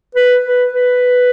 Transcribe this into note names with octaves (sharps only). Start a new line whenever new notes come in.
B4
B4
B4